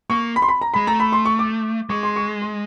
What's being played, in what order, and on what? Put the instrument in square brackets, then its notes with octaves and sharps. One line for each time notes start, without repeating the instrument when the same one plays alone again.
[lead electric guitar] A#3 [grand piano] C#6
[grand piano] B5
C6
B5
A#5
[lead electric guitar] G#3 [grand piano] B5
[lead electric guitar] A3 [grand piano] A#5
[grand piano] B5
C6
C#6
D6
[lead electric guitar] G#3 [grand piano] C#6
[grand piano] C6
C#6
C6